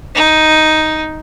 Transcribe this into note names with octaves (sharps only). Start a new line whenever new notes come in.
D#4